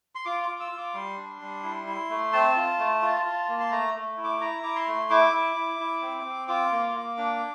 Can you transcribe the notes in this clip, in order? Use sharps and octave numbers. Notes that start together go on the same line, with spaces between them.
C6
F4 D6
D6
F4
E6
F4
D6
G3 C6
D4
G3
E4
E4
A3
C4 A5
F4
A3
F4
F4
A#3
C6
A3 A#5
A3
E4
D6
E4 A#5
E4 D6
C6
A3
E4 D6
E4
E4
E4
C4
C4
F4 D6
A#3
A#3
D4